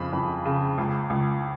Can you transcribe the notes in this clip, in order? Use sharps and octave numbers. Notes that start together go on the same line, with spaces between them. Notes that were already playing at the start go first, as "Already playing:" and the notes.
Already playing: F2 C#3 B5
F2
C#3
C#2
C#2